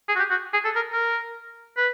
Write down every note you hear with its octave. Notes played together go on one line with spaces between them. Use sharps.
G#4
F#4
G4
F#4
G#4
A4
A#4
A#4
B4